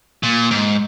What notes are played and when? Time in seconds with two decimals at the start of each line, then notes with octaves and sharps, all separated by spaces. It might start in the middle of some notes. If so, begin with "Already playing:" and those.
0.23 A#2
0.51 G#2